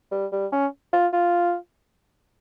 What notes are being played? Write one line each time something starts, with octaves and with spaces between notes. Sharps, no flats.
G3
G3
C#4
F4
F4